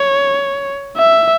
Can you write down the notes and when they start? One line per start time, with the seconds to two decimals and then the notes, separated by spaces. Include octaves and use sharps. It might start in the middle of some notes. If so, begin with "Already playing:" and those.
Already playing: C#5
0.97 E5